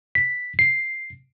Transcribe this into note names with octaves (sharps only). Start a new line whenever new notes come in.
B6
C7